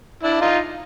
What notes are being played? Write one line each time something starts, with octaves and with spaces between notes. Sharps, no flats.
D4 E4
D#4 F4